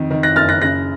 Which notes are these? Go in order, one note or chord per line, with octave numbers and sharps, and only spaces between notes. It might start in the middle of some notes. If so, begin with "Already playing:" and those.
Already playing: F2 D#3
D#3
F#6 A#6
F#1 F6 A6
F#6 A#6
C#3 F#6 A#6